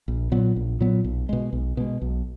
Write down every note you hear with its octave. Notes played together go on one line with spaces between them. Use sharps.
A#1
A#2 F#3 B3
A#1
A#2 F#3 B3
B1
B2 G#3
B1
B2 G#3
B1